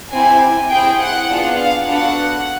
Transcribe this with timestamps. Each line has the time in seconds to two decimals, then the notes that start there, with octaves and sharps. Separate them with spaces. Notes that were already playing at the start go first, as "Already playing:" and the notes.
0.13 C4 E4 G4 G#5
0.71 C4 E4 G#4 G5
1.01 F#5
1.29 B3 D4 F4 G#4
1.58 F5
1.87 B3 D4 F#4 A4 F#5